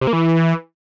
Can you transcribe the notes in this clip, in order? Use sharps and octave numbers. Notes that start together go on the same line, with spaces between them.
C3
A#3
E3